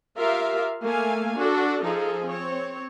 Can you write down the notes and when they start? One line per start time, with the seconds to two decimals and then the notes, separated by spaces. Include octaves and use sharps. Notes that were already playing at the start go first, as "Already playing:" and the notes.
0.17 F4 G4 A#4 E5 F5
0.81 A3 A#3 F5 G#5
1.37 D4 F#4 A4
1.82 F3 D#4 G#4 A4
2.25 C4 C#5